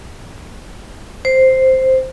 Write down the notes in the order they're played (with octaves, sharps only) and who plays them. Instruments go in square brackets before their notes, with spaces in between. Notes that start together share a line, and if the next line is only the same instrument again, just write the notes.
[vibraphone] C5